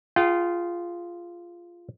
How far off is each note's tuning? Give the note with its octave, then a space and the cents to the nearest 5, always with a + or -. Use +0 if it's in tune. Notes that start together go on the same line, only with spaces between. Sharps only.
F4 -10 G#4 +0 G5 -40